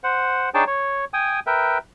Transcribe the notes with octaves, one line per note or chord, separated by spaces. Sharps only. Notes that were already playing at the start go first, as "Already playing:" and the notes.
C5 F#5
D4 D#4 G#4 C#5 G5 A5
C#5
G5 G#5 D#6
A#4 B4 E5 G5